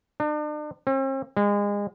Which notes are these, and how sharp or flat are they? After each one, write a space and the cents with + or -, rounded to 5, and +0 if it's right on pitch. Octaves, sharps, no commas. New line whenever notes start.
D4 +40
C4 +45
G#3 -30